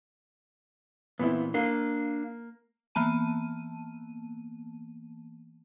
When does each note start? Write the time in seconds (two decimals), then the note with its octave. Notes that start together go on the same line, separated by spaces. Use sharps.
1.19 A#2 E3 B3 C4 E4
1.54 A#3 D4 F5
2.95 E3 A#3 B3 A5 D#7